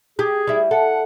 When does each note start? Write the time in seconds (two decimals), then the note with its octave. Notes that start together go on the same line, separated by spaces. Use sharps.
0.19 G4 G#4
0.47 G3 E4
0.71 A4 F#5